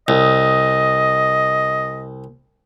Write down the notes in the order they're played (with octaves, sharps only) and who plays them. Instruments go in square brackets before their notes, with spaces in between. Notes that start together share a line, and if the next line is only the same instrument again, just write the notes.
[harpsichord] C2 [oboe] D#5